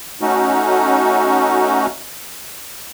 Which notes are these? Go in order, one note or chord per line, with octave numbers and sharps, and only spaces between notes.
A3 C#4 D#4 F#4